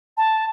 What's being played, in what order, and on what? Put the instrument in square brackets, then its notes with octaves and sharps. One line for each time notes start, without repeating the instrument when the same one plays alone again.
[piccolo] A5